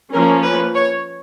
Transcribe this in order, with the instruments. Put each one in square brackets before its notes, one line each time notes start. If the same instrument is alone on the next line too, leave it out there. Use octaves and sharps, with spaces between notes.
[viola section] F3 A#3 C#4 A#4
B4
C#5